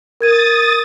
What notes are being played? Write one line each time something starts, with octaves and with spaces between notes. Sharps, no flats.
A#4 D#6 G#6 A6 D#7